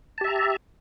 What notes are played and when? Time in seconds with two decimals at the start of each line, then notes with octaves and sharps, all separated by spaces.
0.18 A5
0.21 G4
0.24 E5
0.28 A#5